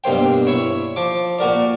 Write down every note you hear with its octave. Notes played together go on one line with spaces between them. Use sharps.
G2 B2 A#3 C5 G5
E4 C#5
F3 D6
A#2 F#4 A#4 D5